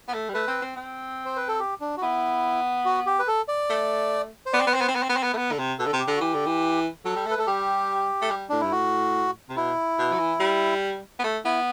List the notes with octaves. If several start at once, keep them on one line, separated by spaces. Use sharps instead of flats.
B3
A3
G3
A3 B4
C4
C4
C4
C5
B4
A4
G4
D4
F#4
B3 E4
F#4
G4
B4
A4
D5
A3
C5
B3 D5
C4
B3 B4
C4 C5
B3
C4
B3
C4
B3
C4
B3
A3
B3
D3
C3
B2 A4
D3
C3
G4
D3
F#4
E3 G4
D3
E3
F#3 A4
G3
A3
B4
A3 A4
G3 G4
A3
G3
A2 D4
G2 E4
A2 F#4
C3
B2 E4
B2
F#3
E3
G3
B3
A3
B3 E4